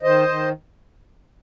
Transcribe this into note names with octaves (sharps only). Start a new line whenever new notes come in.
D#3 C5 D#5
D#3